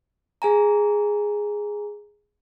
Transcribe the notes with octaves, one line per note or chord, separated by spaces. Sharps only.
G#4 G#5 A#5